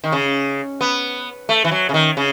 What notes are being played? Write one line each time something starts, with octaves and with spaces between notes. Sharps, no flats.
D#3
C#3
B3
A3
E3
F#3
C#3
D#3
C#3